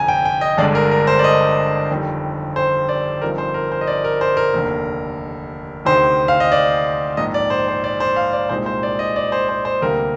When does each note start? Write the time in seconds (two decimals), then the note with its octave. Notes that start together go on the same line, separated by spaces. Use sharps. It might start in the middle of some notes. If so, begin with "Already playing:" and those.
Already playing: G1 F2 C3 G#5 A#5
0.08 G5
0.25 G5
0.41 D#5
0.57 G1 G2 D3 G#3 D4 D5
0.75 A#4
0.91 A#4
1.07 C5
1.19 D5
1.24 D#5
1.90 G1 F2 D#3 G3
2.56 C5
2.89 D5
3.22 G1 G2 F3 C4 D#4 A#4
3.38 C5
3.54 A#4
3.72 C5
3.81 D#5
3.87 D5
4.04 A#4
4.21 C5
4.37 A#4
4.53 F1 D#2 D3
5.85 D2 C3 D#3 C5
6.28 F5
6.40 D#5
6.52 D5
7.17 A#1 G#2 D#3 D#5
7.34 D5
7.50 C5
7.68 C5
7.84 D5
8.00 C5
8.16 F5
8.33 D5
8.49 C2 A#2 G#3 C4 D#4 C5
8.66 C5
8.83 D5
8.99 D#5
9.16 D5
9.32 C5
9.49 C5
9.65 C5
9.82 D2 C3 G3 A#3 A#4